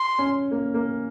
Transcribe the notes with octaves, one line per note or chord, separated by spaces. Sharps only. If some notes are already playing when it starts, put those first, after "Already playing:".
Already playing: C6
C#4
A#3
A#3